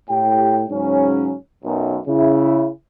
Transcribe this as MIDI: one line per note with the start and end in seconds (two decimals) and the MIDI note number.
0.10 0.64 45
0.10 0.64 67
0.10 0.64 79
0.69 1.34 44
0.69 1.34 49
0.69 1.34 54
0.69 1.34 61
1.64 1.97 35
1.64 1.97 42
2.07 2.69 49
2.07 2.69 64